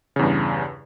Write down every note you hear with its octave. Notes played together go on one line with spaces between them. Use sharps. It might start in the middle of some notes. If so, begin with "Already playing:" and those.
E2 G2 C#3